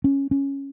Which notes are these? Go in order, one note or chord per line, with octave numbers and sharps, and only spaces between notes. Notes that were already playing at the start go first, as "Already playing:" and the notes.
C#4
C#4